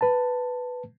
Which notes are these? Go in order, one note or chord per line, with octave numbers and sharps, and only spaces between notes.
B4 A5